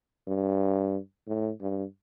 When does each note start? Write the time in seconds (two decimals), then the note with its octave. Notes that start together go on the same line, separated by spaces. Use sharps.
0.27 G2
1.27 A2
1.61 G2